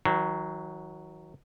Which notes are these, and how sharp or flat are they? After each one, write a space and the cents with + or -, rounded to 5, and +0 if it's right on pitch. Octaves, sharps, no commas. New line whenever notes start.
D#3 +45 F#3 +0